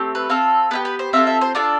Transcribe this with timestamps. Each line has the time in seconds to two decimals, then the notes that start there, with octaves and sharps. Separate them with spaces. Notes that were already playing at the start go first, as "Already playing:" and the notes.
Already playing: A3 C4 G4
0.15 B4
0.29 C4 F4 A4
0.71 B3 E4 G4 B4
0.85 B4
0.99 C5
1.13 C4 F4 A4 E5
1.27 E5
1.41 C5
1.55 D4 F4 A4 D5